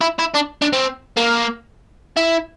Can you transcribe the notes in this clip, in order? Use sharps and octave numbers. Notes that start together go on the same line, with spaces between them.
E4
E4
D4
D4
C4
A#3
E4